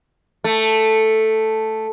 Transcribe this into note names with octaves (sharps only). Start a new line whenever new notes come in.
A3